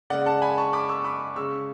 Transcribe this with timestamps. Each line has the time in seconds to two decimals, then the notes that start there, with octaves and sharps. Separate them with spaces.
0.10 C#3 G#3 D5 F#5
0.26 F#5 A5
0.42 G#5 B5
0.57 A5 C#6
0.73 B5 D6
0.89 C#6 E6
1.04 B5 D6
1.36 C#3 G#3 C#6 E6